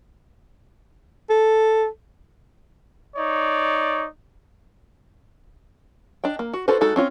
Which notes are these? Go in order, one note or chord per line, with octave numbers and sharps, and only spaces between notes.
A4
D#4 C#5 D5
D4 D#5 G5
A#3
F#4
F4 F#4 A4 B4 C5
G#3 D#4 F#4 A4
C4 C#4 F4